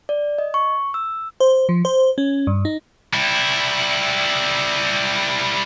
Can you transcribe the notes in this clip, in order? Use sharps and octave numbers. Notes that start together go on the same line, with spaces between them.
D5
D#5
C#6
E6
C5
F3
C5
C#4
G2
D#4
G3 E4